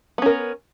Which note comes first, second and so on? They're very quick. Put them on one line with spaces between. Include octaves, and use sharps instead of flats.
B3 C#4 A#4